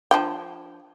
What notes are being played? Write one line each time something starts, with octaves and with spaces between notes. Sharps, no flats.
F3 D4 G5